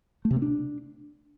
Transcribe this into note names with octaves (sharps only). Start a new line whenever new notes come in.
A3
C3
A#3
D4